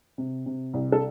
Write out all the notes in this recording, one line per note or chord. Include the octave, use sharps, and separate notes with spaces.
C3
C3
C2
A4